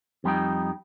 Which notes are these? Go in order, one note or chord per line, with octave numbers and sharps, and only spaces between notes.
F2 G3 D#4 G5